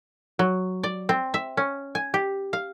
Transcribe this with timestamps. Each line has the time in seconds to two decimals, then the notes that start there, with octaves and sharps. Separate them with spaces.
0.39 F#3
0.83 D5
1.09 C4
1.34 E5
1.57 C#4
1.95 G#5
2.14 G4
2.53 F5